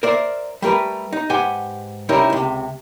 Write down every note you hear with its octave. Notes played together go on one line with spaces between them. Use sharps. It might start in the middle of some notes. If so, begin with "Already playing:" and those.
A#4 C5 D5 E5
G3 A3 A#4 B4
D#4
G#2 G4 B4 F#5 G#5
C3 G3 C#4 D#4 E4 A#4
C#2 C3